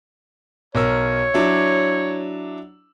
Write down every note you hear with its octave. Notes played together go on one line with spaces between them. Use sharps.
B1 A#4 C#5 E6
F#3 D4 E4